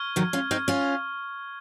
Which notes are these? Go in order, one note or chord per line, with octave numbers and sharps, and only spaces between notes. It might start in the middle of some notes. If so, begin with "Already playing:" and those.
Already playing: C#6 F6 G#6
D#3 F#3
C#4 F4
C4 D#4
C#4 F4